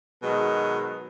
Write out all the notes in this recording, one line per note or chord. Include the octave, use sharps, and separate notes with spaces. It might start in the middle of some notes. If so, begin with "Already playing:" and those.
B2 D#3 F#3 G#3